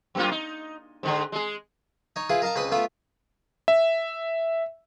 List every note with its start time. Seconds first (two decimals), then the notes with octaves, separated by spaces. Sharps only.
0.15 F#2 A#3 F4
0.31 D#4
1.03 G#2 D3 G#4
1.32 G#3 G#4
2.16 D#4 C#5
2.29 E4 F4 G#4 B4
2.42 A#4 D#5 F5 A5 A#5
2.56 C#2 C4 B4 B5 C6 D#6
2.72 A3 B3 F4 E5 B5
3.68 E5